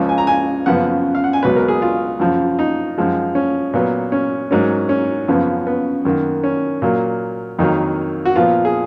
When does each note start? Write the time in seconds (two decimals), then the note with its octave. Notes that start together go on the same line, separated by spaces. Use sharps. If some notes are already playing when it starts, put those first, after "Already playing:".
Already playing: C#2 C#3 F3
0.09 G#5
0.18 A#5
0.27 G#5
0.66 F#2 C#3 F3 B3 F#5
1.15 F5
1.24 F#5
1.33 G#5
1.43 C#2 B2 F#3 B3 B4
1.56 A#4
1.68 G#4
1.82 F4
2.20 F#2 C#3 F3
2.59 D#4
2.98 F#2 F3 G#3
3.35 C#4
3.73 A#2 F#3 B3
4.12 C#4
4.51 G#2 F#3 A#3 C#4
4.89 C#4
5.28 F#2 C#3 F3 B3
5.67 B3
6.05 F#2 D#3 A#3
6.44 C#4
6.82 A#2 F#3 A#3
7.59 F2 D#3 F#3 A#3 D#4
8.25 F#4
8.36 A#2 F3 B3 F4
8.65 G#4